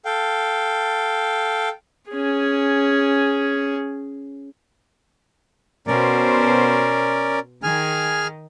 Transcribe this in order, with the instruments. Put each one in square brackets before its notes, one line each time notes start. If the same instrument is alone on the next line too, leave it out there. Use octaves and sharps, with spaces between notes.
[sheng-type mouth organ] A4 F5 G5
[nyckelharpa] C#4 G#4
[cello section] B2 C5 [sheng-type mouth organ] C#4 A#4 D5
[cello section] D#3 [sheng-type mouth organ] G#4 G#5 F6